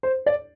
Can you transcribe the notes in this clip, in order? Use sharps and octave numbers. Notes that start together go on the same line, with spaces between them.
C5
D5